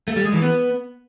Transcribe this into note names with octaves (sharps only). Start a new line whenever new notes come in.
A3
G3
G#3
E3
B3